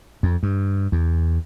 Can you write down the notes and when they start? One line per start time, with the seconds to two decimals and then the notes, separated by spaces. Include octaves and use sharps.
0.23 F2
0.43 G2
0.92 E2